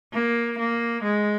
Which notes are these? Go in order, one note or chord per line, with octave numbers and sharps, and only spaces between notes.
A#3
A#3
G#3